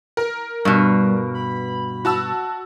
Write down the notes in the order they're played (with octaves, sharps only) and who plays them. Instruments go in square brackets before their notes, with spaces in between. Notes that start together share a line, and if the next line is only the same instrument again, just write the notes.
[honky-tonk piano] A#4
[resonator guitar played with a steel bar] G2 B2 [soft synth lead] G3
[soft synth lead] B5
[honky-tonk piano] F#4 A5 E6